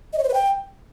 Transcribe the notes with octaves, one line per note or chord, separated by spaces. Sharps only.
D#5
C#5
C5
B4
G5